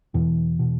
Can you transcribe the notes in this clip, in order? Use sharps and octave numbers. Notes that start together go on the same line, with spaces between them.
E2 B2 E3
B2